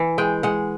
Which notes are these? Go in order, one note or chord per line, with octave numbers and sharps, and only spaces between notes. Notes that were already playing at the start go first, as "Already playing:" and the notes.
Already playing: E3
G#3 G5
G#3 F#5